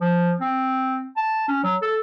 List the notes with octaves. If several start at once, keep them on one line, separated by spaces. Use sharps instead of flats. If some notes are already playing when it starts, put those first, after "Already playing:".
F3
C4
A5
C#4
F#3
A4